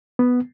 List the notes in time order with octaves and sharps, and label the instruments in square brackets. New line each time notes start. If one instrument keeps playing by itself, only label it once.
[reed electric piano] B3